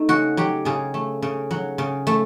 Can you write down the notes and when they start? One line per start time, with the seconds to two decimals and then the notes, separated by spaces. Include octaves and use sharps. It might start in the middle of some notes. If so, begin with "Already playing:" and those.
Already playing: A3 D#4
0.09 C#3 F#4
0.37 F#3 G4
0.65 C#3 G#4
0.94 A3
1.22 C#3
1.51 F#3
1.78 C#3
2.07 A3